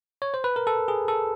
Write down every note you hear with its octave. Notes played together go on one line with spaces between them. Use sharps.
C#5
C5
B4
A#4
A4
G#4
A4